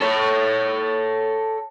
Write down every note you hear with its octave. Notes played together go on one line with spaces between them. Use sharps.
A4 C#5